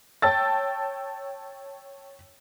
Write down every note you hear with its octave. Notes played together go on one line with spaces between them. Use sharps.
C#5 G5 A5 E6 A6